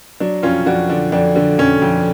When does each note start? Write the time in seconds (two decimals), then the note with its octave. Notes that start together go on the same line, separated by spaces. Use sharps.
0.20 F#3 D4
0.42 F2 C#4 F4
0.66 F2 D4 F#4
0.89 D3 D4
1.12 F2 D4
1.35 D3
1.58 F2 C#4
1.82 F2